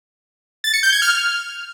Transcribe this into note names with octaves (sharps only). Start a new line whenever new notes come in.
A6
C#7
G6
G#6
F6